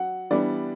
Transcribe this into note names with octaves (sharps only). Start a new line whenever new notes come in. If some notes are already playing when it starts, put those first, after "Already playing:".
Already playing: F#3 F#5
E3 G3 B3 D4 D5